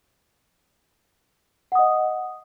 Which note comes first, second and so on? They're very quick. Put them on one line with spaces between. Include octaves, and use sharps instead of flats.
F#5 D#6 D#5